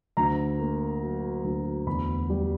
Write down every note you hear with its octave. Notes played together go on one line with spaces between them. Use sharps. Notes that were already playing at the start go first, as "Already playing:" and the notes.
D2 A#5
A#3
F#3
D2
E2 B5
G3